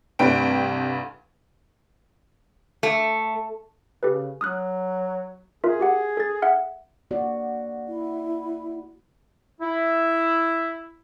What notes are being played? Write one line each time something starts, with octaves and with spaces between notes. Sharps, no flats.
C2 G2 A3 B4 G5 D7
A3
C#3 G4 A4 B4
F#3 D#6 F6 F#6
F4 G#4 A#4 E5
F#4 G4 F#5
A4 A6
E5 F#5 F6
A#3 F#4 D5
E4
E4